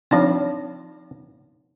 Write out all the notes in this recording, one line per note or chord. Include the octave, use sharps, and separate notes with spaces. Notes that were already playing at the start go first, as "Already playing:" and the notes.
F3 C4 D4 D#4 F4 C#5